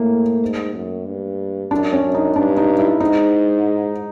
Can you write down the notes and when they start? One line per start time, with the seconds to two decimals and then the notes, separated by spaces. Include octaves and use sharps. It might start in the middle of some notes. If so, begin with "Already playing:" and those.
Already playing: A2 A3 A#3
0.41 G#2
0.74 F#2
1.06 G2
1.71 F#2 D4
1.93 C#4
2.03 F#2
2.14 D#4
2.36 G2 D4
2.58 D#4
2.79 E4
3.00 G#2 D#4